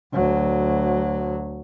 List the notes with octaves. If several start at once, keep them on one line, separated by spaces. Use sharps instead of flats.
D2 F#3